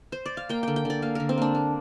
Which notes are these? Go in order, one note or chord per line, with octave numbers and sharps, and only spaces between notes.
C5
D5
F5
A#3 G5
D3 G5
G5
D3 D5
A#3 F5
D3 A#4
C4
A#3 D4
A#3